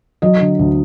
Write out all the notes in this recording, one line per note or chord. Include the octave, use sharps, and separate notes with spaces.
F#3 D#5
D3
D2